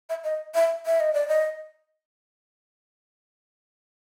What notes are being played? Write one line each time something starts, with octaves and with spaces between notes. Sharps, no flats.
E5
D#5
E5
E5
D#5
D5
D#5